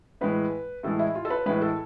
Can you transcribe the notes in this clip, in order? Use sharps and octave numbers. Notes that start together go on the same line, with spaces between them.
A2 E3 G#3 B4
A2 E3 G#3 A4
E4
F4
A4
B4
A2 E3 G#3 B4
A4